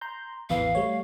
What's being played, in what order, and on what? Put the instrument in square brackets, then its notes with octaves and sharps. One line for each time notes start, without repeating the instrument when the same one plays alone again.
[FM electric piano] A#5 C6 G6
[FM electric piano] A1 E2 B4 [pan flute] F5
[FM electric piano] G3 A3 C#5